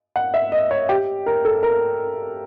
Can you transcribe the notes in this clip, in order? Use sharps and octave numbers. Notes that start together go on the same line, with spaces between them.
F#5
E5
D#5
C#5
G4
A#4
A4
A#4